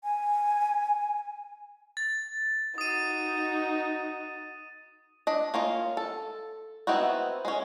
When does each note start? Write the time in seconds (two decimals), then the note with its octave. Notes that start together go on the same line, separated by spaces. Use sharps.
0.04 G#5
1.97 A6
2.78 D#4 F#4 D#6 D#7
5.27 D4 D#5
5.54 A#3 C#4 F4
5.97 A4
6.87 B3 C4 D#4 E4 F#4
7.45 G#3 C#4